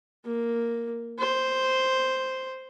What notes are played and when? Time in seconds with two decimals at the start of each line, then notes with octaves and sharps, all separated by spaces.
0.25 A#3
1.19 C5